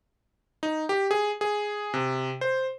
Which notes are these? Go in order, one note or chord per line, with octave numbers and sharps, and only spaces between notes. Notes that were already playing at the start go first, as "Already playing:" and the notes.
D#4
G4
G#4
G#4
C3
C5